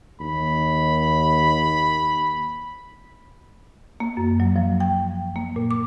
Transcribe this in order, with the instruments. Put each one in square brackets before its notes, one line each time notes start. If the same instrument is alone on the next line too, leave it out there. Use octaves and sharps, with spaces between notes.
[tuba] D#2 [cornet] B5
[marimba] A#3
F#2
F#3
F3
G5
A#3
A#2
D6